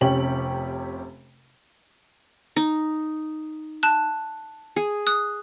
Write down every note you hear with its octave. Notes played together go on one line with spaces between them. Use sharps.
F1 C3 C#4 G4 F#7
D#4
A5 F#6
G#4
D#6 F#6